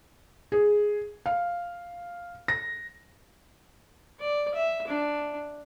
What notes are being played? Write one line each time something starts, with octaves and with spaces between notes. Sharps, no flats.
G#4
F5
A#6
D5
E5
D4